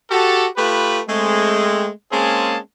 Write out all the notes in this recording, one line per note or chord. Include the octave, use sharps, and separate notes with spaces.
F#4 G4 A4
A3 F4 G4 B4
G#3 A3 C4
G#3 A#3 C4 C#4 G#4 A5